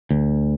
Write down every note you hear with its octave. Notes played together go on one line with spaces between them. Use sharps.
D2